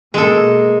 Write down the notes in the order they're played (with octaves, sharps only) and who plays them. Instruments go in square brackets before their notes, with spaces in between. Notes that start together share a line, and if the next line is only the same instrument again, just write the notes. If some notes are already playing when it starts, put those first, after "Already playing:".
[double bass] B2 A#3 [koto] G#3 A4